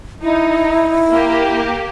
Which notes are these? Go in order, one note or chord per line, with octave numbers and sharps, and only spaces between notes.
D#4 E4
A#3 G4